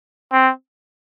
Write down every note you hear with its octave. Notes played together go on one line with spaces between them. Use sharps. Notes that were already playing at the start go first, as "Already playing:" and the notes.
C4